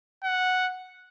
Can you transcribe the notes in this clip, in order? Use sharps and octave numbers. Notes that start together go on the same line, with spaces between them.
F#5